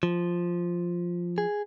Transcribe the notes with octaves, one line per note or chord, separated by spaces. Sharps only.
F3
G#4